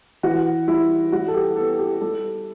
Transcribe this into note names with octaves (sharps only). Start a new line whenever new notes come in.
E3 F#4
G3 E4
G3 F#4
A4
G4
B3 A4
G4
G3 A4